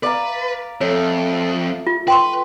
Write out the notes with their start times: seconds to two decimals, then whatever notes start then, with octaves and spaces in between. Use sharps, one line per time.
0.03 B4 D5 F5 A#5
0.81 F2 A3 C#5
1.87 F4
2.08 B4 G5 C6 C#6